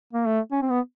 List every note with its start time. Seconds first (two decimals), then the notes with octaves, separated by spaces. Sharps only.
0.13 A#3
0.26 A3
0.52 C#4
0.62 C4
0.70 B3